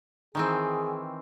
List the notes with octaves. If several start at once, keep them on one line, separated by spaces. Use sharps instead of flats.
D#3 E3 C4 G#4